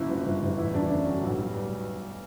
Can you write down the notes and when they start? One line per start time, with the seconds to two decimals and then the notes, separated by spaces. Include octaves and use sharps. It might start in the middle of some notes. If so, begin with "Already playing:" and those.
Already playing: F#1 F#2 E4
0.10 G1
0.26 G1
0.42 G1
0.58 E2 E4
0.74 E2 D4
0.90 D3 C#4
1.06 F#3
1.23 B1
1.39 G3
1.55 B2